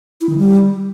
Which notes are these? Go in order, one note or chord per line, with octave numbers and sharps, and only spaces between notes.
E4
D#3
G3